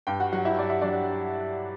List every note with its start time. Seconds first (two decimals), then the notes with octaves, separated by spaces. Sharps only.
0.07 G2 G4 G5
0.20 F#4 F#5
0.32 F#3 F#4 F#5
0.45 E4 E5
0.58 G2 D5
0.70 E5
0.81 F#3 D4 D5